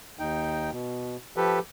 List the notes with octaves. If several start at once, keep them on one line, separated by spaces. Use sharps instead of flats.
D#2 D#4 G5
B2
F3 G4 A4 B4